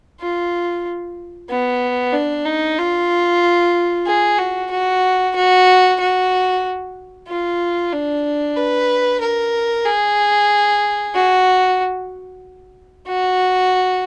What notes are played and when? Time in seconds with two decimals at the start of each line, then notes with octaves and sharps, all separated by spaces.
0.20 F4
1.49 B3
2.13 D4
2.45 D#4
2.78 F4
4.06 G#4
4.39 F#4
4.71 F#4
5.36 F#4
6.00 F#4
7.28 F4
7.93 D4
8.57 B4
9.21 A#4
9.86 G#4
11.15 F#4
13.07 F#4